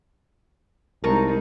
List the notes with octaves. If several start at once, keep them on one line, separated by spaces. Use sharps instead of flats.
C2 G#3 D#4 A#4 A5 A#5 C#6